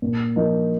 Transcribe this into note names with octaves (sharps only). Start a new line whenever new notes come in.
A#2
F3 A#3 D#4